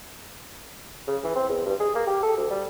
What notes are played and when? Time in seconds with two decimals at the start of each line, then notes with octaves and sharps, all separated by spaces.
1.07 C#3
1.24 E3
1.35 C4
1.49 E2
1.65 G2
1.80 G#4
1.95 A#3
2.07 G4
2.23 A4
2.37 D2
2.50 G3